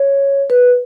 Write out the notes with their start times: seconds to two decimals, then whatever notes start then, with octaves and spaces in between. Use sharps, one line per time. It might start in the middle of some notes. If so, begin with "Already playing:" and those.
Already playing: C#5
0.50 B4